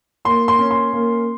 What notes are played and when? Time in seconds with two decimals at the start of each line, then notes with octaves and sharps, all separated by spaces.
0.25 A#3 C6
0.48 C6
0.59 C#4
0.71 C6
0.93 A#3